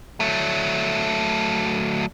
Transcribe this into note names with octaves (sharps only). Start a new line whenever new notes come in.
F#3 A3